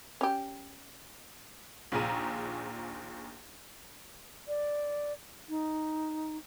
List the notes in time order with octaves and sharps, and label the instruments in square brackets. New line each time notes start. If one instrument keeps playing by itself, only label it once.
[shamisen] C#4 G4
[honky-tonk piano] A#1 D#2 A#2 G#4 A#5 D#7
[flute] D5
D#4